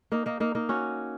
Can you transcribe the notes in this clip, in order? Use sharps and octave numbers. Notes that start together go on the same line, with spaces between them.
A#3 D#4
A#3 D#4
A#3 D#4
A#3 D#4
C#4 F#4